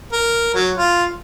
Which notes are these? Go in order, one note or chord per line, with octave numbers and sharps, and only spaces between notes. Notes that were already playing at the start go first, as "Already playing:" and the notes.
A#4
F#3
F4